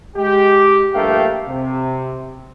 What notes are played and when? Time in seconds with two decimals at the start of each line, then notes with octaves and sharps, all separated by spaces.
0.16 G#3 G4
0.94 A#1 G2 A3 A#3 F5 G5
1.47 C3